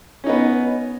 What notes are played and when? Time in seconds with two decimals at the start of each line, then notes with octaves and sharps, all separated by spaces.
0.24 C#4
0.26 D#4
0.29 B3